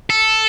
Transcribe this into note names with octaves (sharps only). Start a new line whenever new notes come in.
A4